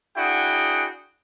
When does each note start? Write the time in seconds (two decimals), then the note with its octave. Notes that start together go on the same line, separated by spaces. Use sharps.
0.17 D4 E4 F#4 G#4 F#5 G5